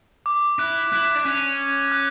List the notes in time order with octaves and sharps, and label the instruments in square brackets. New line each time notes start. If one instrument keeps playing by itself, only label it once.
[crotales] D6
[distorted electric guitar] E4 [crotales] F#6
[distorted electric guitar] E4 [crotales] F#6
[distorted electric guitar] D4
[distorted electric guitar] C#4 [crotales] F#6
[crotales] F#6